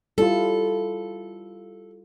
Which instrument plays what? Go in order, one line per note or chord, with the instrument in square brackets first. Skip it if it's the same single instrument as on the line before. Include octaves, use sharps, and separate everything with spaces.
[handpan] G3 E4 F4 [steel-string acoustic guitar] A4